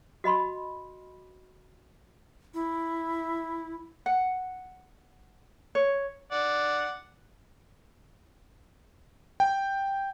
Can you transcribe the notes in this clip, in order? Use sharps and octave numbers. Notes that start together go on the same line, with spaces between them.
F#4 D#5 B5 C6
E4
F#5
C#5
D5 F#5
G5